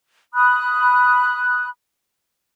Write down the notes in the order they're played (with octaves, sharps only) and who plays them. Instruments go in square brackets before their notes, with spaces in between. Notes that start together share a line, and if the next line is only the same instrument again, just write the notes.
[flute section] B5 D#6 F#6